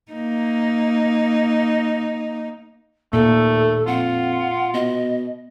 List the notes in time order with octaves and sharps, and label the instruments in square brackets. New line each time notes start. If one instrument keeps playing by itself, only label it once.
[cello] A#3 D#4
[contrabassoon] D#2 [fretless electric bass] A#2 [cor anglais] A3 [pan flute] A4
[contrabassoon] F2 [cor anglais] F4 [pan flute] F#5
[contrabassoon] B2 [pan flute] D#5